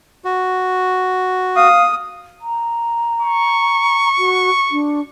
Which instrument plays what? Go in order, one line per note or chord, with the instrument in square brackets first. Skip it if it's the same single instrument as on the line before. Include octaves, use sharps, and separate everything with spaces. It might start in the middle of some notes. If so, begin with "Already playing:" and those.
[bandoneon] F#4
[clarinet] F5 [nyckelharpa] D#6
[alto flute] A#5
[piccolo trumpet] C#6
[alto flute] F#4
D4